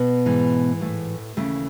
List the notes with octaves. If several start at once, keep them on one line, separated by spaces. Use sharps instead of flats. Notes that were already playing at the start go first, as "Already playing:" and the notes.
Already playing: B2 B3
G#2 E3
A2 A3
D#2 A2 C#3 E3 A3